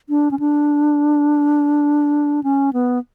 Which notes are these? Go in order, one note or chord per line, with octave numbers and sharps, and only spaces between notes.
D4
C#4
D4
C#4
B3